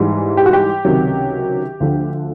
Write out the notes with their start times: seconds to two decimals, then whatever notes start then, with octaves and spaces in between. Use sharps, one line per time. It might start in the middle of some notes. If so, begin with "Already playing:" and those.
Already playing: G#2 E3 G3
0.37 G4
0.46 F#4
0.53 G4
0.85 C#2 C3 D#3 F#3
1.80 D2 D3 F3